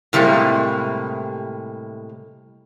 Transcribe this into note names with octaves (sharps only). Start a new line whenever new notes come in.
A2 C3 G3 G#3 A#3